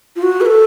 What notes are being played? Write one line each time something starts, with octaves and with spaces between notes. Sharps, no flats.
F4
F#4
B4
A4